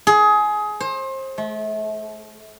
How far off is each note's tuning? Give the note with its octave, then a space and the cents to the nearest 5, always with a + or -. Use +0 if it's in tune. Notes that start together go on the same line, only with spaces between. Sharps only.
G#4 +20
C5 +30
A3 -35